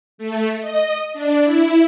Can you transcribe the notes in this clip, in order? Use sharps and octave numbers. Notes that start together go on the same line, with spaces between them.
A3
D#5
D4
E4